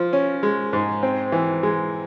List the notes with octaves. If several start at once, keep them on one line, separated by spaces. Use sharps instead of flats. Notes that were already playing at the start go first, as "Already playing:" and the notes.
Already playing: F3
C#4
G#3
G#2
C4
E3
G#3